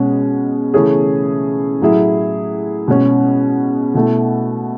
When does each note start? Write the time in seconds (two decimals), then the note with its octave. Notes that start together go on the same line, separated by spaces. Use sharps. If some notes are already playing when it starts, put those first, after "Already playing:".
Already playing: B2 G#3 C#4
0.74 C#3 E3 A3 C#4 G#4
1.81 A2 F#3 A3 E4 G#4
2.88 B2 G#3 C#4
3.95 B2 A3 E4